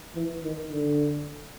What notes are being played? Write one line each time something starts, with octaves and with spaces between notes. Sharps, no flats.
E3
D#3
D3